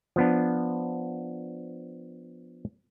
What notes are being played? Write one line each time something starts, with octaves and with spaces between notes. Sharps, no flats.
F3 B3 D4